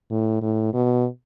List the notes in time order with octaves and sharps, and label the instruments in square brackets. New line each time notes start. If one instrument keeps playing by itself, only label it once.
[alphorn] A2
A2
B2